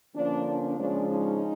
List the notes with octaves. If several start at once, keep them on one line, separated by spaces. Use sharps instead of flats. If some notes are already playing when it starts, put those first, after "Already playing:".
D3 F3 A#3 C#4 D4
C#4
C#3 F3 G#3 C#4 D4
C#4 D#4